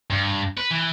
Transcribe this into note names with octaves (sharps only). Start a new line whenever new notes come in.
G2
B4
E3